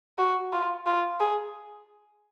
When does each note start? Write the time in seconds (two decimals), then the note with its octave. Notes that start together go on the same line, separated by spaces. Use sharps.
0.18 F#4
0.52 F4
0.86 F4
1.20 G#4